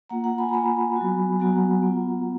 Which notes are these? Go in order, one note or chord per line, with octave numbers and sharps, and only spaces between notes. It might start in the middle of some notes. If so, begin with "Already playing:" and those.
A#3 F4 F#5 A#5
F#5 A#5
G#5 B5
A#5
A#3 F4 G#5 B5
F#3 B3 F#4
F#3 B3 F#4 F#5 A#5
B3 F4